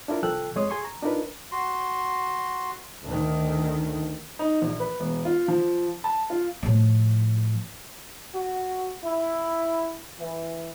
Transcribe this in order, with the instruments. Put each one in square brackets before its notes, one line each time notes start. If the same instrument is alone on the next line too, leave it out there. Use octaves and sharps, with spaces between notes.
[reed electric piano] D4 E4 F4 A#4
C2 F3 A4 G5 E6 F#6
F2 G#3 C#5 C6 D#6
G#4 G#5 C6 C#6
A#5
D4 D#4 F4 A#4 B4
[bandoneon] F#4 C6
[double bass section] D2 D#3
[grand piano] D#4
A#1
B4
E1
F4
F3
A5
F4
[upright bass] A2 F3
[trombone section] F#4
E4
E3